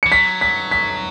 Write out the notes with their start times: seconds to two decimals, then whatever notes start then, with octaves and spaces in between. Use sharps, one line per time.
0.03 E3 C#7
0.11 F#3 B6
0.41 B6
0.71 B6